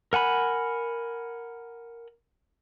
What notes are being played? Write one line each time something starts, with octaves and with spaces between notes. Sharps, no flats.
A#4 F#5 G#5 B5